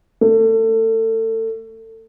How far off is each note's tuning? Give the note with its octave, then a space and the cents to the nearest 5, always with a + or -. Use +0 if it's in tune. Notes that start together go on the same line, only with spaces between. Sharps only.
A3 +30